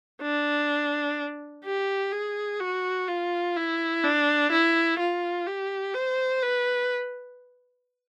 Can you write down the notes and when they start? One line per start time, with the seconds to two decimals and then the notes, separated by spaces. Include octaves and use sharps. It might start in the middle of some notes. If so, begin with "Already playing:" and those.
0.22 D4
1.65 G4
2.13 G#4
2.60 F#4
3.08 F4
3.56 E4
4.04 D4
4.52 E4
4.99 F4
5.47 G4
5.94 C5
6.43 B4